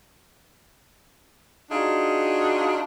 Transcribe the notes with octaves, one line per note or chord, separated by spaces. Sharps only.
D4 D#4 F4 F#4 G#4